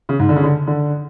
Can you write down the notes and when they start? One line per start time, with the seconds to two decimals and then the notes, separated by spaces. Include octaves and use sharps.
0.09 C#3
0.19 G#2
0.29 D3
0.36 C#3
0.43 D3
0.67 D3